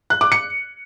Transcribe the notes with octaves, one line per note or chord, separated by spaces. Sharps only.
F#6
D6
C#7